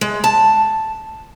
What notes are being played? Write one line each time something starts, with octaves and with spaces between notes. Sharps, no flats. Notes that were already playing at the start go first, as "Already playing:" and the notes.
G#3
A5